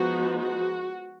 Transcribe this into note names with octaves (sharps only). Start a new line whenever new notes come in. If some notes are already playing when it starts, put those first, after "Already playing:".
Already playing: F3 G#3 B3 D#4 F#4
F#4